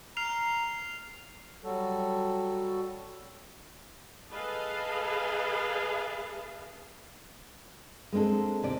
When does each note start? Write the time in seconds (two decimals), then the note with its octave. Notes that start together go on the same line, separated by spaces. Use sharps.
0.17 A#5 F6 C7 F7
1.64 F#3 G3 F#4 A4
4.31 G#4 A4 B4 D#5 F5 A5
8.12 G#3 A#3 C4 D4 A4
8.63 D#2 C3 D5